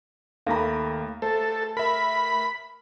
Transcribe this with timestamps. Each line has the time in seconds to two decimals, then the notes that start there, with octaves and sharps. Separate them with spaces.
0.47 D#2 D#3 A3 A#3 F5 A#5 B5 A#6
1.22 A3 A4 C5
1.77 A#4 E5 B5